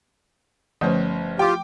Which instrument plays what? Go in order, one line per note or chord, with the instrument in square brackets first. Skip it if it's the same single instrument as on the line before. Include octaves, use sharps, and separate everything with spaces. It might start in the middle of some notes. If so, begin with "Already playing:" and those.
[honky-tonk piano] G1 C#4 C5 [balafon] F3 A3
[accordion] F4 G4 [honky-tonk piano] G5 D6